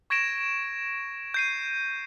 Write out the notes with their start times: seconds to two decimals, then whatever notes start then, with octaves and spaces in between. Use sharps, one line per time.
0.10 C#6 G#6 A#6 D7 E7
1.34 G6 C7 D#7